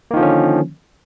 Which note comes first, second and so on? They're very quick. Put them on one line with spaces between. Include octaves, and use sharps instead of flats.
A#3 D#3 F3 D3 C#4